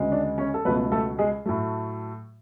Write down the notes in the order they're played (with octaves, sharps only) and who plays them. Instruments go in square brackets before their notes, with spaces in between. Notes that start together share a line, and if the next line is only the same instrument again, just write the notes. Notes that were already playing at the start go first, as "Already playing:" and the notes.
Already playing: [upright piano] D2 C#3 G#3
D4
C#4 C#5
A4
C#2 B2 F#3 A3 B3 B4
A3 A4
G#3 G#4
A2 F#3 A3